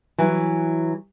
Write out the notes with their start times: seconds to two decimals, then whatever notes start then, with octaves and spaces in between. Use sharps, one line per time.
0.18 E3 F#3